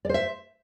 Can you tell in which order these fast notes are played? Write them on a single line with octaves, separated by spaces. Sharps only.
D5 C5 E5